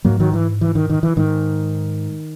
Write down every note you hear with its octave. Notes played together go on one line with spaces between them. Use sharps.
G#2 F#3 A#3
D#3 F#3
E3
E3
D#3
D#3
E3
G#2 D#3